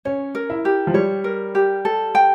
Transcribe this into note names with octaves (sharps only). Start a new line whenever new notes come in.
C#4 C#5
A#4
E4
G4
F3
G3 C#5
A#4
G4
A4
G5